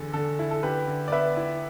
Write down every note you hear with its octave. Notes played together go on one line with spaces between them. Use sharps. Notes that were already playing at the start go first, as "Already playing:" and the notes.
Already playing: E2 D3 A4
D3 A4
E4
A4
D3 G4 B4
D3
D5
B3 B4 E5
E4